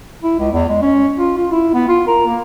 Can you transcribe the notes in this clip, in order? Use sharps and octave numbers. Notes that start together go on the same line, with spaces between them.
E4
C#2
E2
G#3
C#4
F4
F4
E4
B3
F4
A#4
A#3